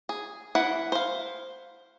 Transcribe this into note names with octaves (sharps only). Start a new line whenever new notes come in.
G#4
E3 E4 F#5
C5 F5